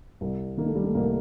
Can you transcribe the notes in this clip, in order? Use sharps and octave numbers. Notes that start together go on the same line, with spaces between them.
C2 G3
D#3 A#3
A3
G3
A3
C2 A#3